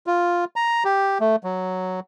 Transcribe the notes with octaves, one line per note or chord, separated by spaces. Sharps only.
F4
A#5
G4
A3
F#3